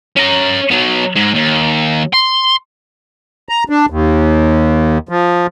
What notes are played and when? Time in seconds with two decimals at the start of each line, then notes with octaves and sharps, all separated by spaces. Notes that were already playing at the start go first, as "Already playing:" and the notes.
0.16 C#4 A#5
0.71 F#3 B3
1.16 G#2 G#3
1.35 D#2
2.13 C6
3.49 A#5
3.70 D4
3.90 D#2
5.09 F3